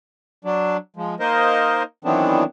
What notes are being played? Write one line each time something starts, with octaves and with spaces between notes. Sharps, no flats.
F#3 D4
F3 G#3
A#3 D#4 A#4 C5 D#5
D#3 E3 F#3 B3 C4 D4